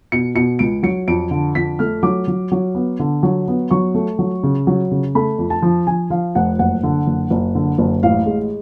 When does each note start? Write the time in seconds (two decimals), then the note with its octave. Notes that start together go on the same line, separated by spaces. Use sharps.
0.12 B2 C#7
0.35 B2 C#7
0.59 C#2 D7
0.83 F#3 C#7
1.08 F2 D7
1.31 D3
1.55 F2 B6
1.79 A3 F6
2.03 F#3 D6
2.28 F#3
2.52 F#3
2.75 B3
2.99 D3
3.23 F#3
3.48 B3
3.71 F#3 C#6
3.95 A3
4.19 F#3
4.43 C#3
4.67 F#3
4.91 C#3
5.15 A3 B5
5.38 F2
5.50 A5
5.62 F3
5.87 F3 G#5
6.10 F3 F5
6.35 F1 F#5
6.59 F#1 F#5
6.83 D3
7.07 F#1
7.30 F#1
7.55 D3
7.78 F#1
8.03 A1 F5
8.26 G#3